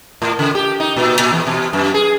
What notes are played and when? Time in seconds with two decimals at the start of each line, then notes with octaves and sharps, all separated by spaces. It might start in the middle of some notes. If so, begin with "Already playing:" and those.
0.22 A2
0.39 C#3
0.55 G4
0.80 D#4
0.96 A#2
1.19 A#2
1.33 E2
1.47 B2
1.73 F#2
1.94 G#4